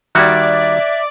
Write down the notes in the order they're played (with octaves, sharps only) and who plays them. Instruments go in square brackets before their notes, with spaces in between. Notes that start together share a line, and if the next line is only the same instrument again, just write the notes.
[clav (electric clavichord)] D#3 G3 F#4 [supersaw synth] D5 [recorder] E5 [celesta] F#6 G#6